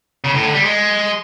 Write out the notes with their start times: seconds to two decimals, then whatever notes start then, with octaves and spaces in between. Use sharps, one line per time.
0.24 C#3
0.34 A2
0.44 D3
0.54 G3
0.64 G#3